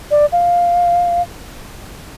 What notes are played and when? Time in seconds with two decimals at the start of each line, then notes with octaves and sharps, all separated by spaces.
0.11 D5
0.32 F5